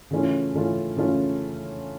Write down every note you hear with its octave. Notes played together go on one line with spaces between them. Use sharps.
C#3 E3 A3 C#4 F4
C#3 E3 A3 C#4 F4
C#3 E3 A3 C#4 F4